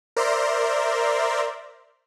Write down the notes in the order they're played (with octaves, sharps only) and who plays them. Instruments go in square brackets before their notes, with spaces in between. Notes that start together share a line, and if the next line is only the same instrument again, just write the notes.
[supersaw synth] A#4 C5 D5 E5 A#5 C6